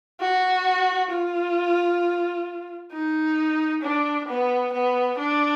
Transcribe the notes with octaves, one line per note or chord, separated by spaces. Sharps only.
F#4
F4
D#4
D4
B3
B3
D4